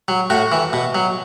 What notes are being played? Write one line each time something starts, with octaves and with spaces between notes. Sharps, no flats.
F#3
A2 F#4
E3
B2
F#3